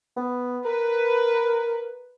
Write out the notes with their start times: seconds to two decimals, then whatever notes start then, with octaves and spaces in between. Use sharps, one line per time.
0.17 B3
0.65 A#4 B4